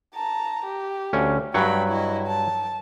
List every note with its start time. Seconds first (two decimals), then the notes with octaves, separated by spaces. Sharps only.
0.14 A5 A#5
0.65 G4
1.13 D2 C#4
1.54 G2 F#3 C#5 G5 B5
1.88 E4 D#5
2.27 A5